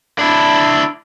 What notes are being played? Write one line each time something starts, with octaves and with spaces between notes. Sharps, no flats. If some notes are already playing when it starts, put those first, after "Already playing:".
D4 E4